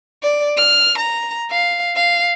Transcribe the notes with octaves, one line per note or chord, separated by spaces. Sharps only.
D5
F6
A#5
F5
F5